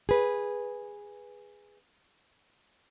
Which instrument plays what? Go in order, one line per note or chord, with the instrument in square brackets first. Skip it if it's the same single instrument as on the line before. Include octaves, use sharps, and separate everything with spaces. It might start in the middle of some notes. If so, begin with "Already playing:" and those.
[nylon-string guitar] G#4 B4